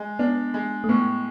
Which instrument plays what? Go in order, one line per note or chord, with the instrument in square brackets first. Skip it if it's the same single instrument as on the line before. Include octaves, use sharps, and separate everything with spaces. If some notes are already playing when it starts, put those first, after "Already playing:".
Already playing: [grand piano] G#3
[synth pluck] B3 [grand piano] D4
[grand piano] G#3
[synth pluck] A3
[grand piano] A2 [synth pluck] B3